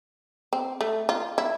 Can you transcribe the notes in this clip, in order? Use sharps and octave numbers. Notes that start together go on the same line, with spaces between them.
C4
A3
F4
E4